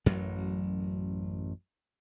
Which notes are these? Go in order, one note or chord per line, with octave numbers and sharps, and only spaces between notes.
A1 F#2 F#3